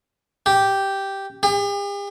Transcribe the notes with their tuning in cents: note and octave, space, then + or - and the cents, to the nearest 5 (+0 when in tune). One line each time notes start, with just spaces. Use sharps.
G4 -5
G4 +45